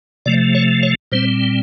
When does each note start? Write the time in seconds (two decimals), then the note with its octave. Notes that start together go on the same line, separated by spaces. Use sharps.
0.26 C3 F3 A3 D5
0.55 C#5
0.83 C#5
1.12 A#2 G3 C4 C5